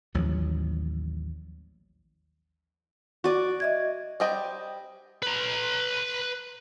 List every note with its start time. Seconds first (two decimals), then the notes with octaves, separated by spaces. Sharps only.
0.14 A1 D#2 F3 F#3
3.24 F#4 D5
3.60 D#5 E5 G#6
4.20 G3 C4 D#5 G5
5.23 B4 A#5